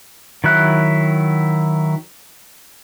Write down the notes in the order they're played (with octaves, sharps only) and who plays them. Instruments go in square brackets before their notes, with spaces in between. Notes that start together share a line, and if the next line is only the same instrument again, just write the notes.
[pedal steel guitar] D#3 F#3 E4 F#6